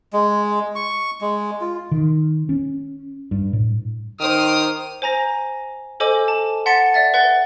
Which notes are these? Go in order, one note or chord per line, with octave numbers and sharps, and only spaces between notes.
G#3
C#6
G#3
F4
D#3
C#4
G2
A2
D#3 C5 D6 D#6 F6
C5 G#5 A#5 A#6
A4 C5 D#5 G#5 D6
A5
F#5 A5 C6 A6 B6 C#7
D5 E5 A6
B4 F#5 A6 G7